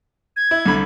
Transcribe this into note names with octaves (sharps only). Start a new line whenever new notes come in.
G#6
E4
C2 D3 B5